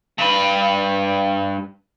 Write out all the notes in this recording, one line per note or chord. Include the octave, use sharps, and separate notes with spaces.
G2 B4